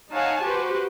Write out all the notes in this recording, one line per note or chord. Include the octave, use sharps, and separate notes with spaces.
D#4 C#5 F5 F#5 G#5 A5
F#4 G4 B4 C5